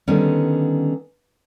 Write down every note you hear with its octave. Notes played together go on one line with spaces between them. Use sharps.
D3 D#3 G3 B3 C#4